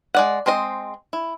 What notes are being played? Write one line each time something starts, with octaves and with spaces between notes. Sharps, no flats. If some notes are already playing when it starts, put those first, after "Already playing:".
G#3 D5 F#5
G#3 C4 C5 D#5
E4